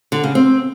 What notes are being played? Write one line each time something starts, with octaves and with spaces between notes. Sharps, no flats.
D3
C#3
C4